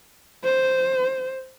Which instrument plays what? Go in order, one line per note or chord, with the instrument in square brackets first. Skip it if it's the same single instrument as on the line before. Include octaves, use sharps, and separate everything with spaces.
[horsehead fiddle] C5